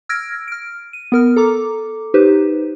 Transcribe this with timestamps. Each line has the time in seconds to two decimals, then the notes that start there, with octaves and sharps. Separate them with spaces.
0.09 E6 F6 G#6 A#6 D7
0.48 F6 D7
0.93 D#7
1.12 B3 A#4 F6
1.36 A4 A#5 D6
2.14 D#4 G4 B4 C5